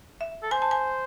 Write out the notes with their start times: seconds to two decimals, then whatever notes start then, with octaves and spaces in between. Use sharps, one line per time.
0.21 E5
0.43 A4
0.51 C5 G#5
0.62 A5
0.71 G#5